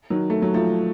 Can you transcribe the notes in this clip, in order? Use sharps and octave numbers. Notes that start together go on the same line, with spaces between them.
D#3 F#3
A3
F#3
F3 A3